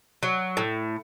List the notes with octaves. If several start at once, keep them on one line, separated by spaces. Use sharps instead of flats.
F#3
A2